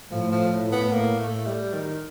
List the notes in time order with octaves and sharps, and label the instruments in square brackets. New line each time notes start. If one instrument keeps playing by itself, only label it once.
[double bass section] A2 [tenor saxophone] F3
[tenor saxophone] F3
B3
A#3
A3
G3
D#3